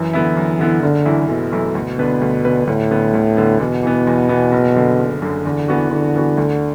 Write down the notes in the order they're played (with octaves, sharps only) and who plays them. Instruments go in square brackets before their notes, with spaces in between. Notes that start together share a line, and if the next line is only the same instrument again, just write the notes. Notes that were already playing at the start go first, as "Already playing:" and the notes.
Already playing: [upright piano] F#2 [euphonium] E3
[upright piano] D3 B3 E4
F#2
D3 B3 E4
[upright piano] F#1 [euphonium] D3
[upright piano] F#2 E3 A3 E4
[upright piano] F#1 [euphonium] B2
[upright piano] F#2 E3 A3 E4
D2
D3 B3 D4 B4
D2
D3 B3 D4 B4
[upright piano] D2 [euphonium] A2
[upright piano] D3 B3
D2
D3 B3
[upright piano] E2 [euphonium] B2
[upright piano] E3 B3
E2
E3 B3
F#1
F#2 D3
F#1
F#2 D3
[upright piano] E2 [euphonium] D3
[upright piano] E3 B3 F#4
[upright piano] E2 [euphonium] D3
[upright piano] E3 B3 F#4
D2